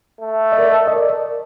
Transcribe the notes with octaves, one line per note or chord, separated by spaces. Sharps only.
A3
D#5
A#4 D5
D#5
A#4 D5